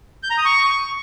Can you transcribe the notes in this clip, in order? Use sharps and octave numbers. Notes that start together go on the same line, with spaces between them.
G6
A#5
D#6
C#6